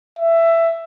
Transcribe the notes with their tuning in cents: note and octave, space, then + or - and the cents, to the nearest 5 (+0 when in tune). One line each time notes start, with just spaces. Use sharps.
E5 +15